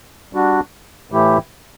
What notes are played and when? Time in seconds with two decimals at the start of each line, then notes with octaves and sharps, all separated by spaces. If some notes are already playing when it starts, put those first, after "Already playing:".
0.33 G3 D4 F#4
1.11 A2 E3 A3 E4 G4